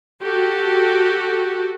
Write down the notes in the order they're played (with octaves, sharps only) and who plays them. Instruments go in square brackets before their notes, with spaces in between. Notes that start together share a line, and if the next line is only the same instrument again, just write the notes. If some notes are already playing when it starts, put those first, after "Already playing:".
[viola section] F#4 G4 A4